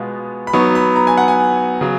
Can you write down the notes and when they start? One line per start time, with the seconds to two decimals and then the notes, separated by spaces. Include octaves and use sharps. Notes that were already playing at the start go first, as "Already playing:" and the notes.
Already playing: B2 G#3 B3 F4
0.47 B5
0.53 F#3 B3 D#4 C#6
0.75 B5
0.96 A#5
1.07 G#5
1.17 F#5
1.28 G#5
1.81 C#3 F#3